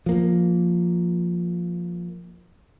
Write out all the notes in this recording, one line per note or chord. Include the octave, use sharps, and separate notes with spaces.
F3 A#3